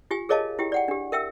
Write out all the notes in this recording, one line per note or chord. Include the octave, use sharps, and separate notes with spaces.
F4 G4 G#5
G#4 A#4 C#5 D#5 F5 A5
E4 G4 G5
D5 F#5 G5
D4 G4
A#4 E5 G5 E6